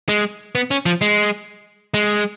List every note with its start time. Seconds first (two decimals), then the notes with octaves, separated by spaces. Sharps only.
0.09 G#3
0.55 B3
0.71 C#4
0.86 F3
1.01 G#3
1.94 G#3